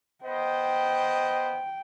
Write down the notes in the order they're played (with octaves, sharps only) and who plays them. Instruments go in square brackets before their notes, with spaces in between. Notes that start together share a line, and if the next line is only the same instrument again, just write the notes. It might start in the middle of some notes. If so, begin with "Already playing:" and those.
[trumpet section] B3 C5 D#5 [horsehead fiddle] G5